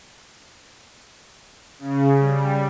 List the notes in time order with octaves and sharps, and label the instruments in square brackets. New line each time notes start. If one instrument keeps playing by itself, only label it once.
[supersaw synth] C#3
G3